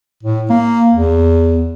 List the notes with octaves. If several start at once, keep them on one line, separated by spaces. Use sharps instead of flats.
A2
A#3
E2